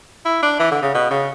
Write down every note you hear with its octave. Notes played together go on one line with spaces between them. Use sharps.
E4
D4
E3
D3
C#3
B2
C#3